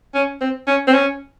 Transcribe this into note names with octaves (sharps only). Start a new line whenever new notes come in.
C#4
C4
C#4
C4
C#4